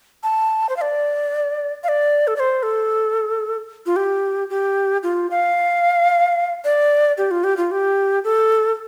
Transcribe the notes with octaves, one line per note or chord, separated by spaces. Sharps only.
A5
C5
F5
D5
F5
D5
A4
D5
C5
A4
F4
G4
G4
F4
F5
D5
G4
F4
G4
F4
G4
A4